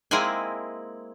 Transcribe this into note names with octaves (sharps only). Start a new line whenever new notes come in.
G#3 A#3 C4 E4 G#4 G#5